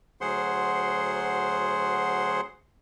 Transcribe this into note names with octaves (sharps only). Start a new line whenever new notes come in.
D2 F#3 G#4 C5 F#5 C6